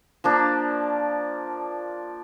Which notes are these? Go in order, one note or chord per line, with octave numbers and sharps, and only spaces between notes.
F3 A#3 D4